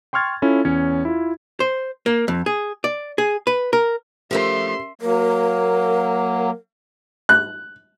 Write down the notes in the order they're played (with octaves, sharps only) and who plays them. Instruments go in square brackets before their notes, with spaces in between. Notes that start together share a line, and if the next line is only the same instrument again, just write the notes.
[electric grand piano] G5 C6 C#6 F6 G#6 A6
C#4 E4 F4 A4
E2 C#4 C#5
E4 F4
[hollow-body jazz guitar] C5
A#3
F2
G#4
D5
G#4
B4
A#4
[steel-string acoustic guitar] F3 A3 F4 [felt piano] C#4 G4 A#4 [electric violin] E5 C6
[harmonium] F#3 A#3 [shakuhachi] A#4
[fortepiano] F#6